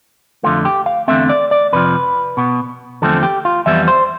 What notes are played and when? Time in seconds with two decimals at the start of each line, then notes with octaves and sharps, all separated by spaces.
0.43 F2 D3 A3 F4
0.65 G4
0.86 F5
1.08 E2 D3 A3 C4 E5
1.29 D5
1.51 D5
1.73 F2 C3 F3 B4
2.37 B2 B3
3.02 E2 D3 F3 A3 C4 A4
3.23 G4
3.45 F4
3.66 F2 E3 G3 B3 E5
3.88 C5